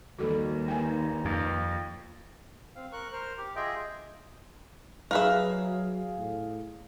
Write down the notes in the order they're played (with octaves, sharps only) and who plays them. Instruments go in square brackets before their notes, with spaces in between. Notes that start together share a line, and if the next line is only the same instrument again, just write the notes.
[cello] D#2 [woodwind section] D#3 E3 G3 [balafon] F#4 A4
[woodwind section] G2 A#3 D#4 [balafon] G5 G#5
[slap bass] F2
[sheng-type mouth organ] C4 F5
A#4 C#6 F#6
A#4 C5 F6
G4
F4 G#4 D#5 E5 G5
[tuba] F#3 [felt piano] G#4 F5 [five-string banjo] A#4 B4 E5
[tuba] A2